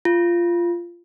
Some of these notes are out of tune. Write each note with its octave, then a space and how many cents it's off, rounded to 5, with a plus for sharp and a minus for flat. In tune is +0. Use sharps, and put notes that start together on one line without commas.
F4 -15